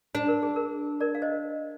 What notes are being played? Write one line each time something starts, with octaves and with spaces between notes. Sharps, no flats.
D4 C5
A#4
G#4
A#4
A#4 D5
F5
C5 D#5